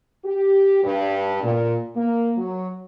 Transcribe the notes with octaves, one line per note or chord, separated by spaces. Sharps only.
G4
G2
A#2
A#3
F#3